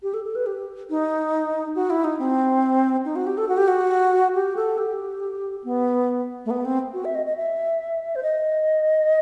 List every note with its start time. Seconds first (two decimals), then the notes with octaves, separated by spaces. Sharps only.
0.03 G4
0.14 A4
0.24 A4
0.35 B4
0.46 G4
0.90 D#4
1.75 F#4
1.90 E4
2.04 D#4
2.19 C4
3.05 D#4
3.16 F#4
3.27 G4
3.38 A4
3.49 F#4
3.58 G4
3.68 F#4
4.35 G4
4.56 A4
4.78 G4
5.64 B3
6.45 A3
6.50 B3
6.65 C4
6.94 F#4
7.05 E5
7.15 D#5
7.26 D#5
7.37 E5
8.15 C5
8.23 D#5